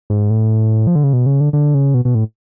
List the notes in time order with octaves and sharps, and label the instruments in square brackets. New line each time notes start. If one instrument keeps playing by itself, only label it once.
[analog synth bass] G#2
A2
F3
D3
C#3
B2
C#3
D3
D3
C#3
B2
B2
A2